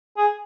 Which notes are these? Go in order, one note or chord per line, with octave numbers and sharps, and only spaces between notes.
G#4